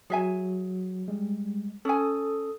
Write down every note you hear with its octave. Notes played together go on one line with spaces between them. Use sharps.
F#3 G#4 E5 G#5
G3 G#3
C#4 A4 G#5 D#6